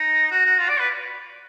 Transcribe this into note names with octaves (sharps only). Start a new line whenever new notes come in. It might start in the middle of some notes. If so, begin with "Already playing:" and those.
Already playing: D#4
F#4
F#4
F4
D5
B4